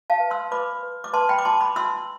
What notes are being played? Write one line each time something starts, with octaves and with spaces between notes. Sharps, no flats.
F5 A5
B4
C6 E6
B4 B5 D6
B4
D6
B4 A5 C6
G5 B5
D6
F4 A5 C6
B5 D6
E4 C6 E6